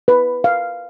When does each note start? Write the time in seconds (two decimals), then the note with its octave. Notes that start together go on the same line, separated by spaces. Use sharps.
0.08 B4
0.44 F5